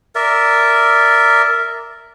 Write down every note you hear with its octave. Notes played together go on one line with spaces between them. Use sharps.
A#4 D5 E5